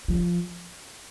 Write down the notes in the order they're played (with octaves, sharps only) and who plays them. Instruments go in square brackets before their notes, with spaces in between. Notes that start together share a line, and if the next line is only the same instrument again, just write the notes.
[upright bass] F3